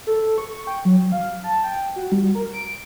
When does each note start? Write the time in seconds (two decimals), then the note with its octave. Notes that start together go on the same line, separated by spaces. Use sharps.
0.07 A4
0.38 C#6
0.67 G5
0.85 F#3
1.12 F5
1.44 A5
1.63 G5
1.96 F#4
2.12 G3
2.35 A#4
2.53 D7